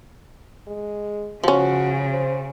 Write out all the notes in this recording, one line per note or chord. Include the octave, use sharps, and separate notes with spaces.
G#3
C#3 F3 C#4 F#4
C5